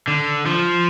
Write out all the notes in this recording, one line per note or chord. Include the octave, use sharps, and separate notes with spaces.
D3
F3